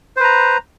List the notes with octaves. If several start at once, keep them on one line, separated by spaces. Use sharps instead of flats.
B4 C5 A#5